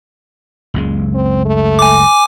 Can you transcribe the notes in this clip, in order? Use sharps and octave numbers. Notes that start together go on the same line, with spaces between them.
F#1 C#2 G#3
C4
A3
G#5 D6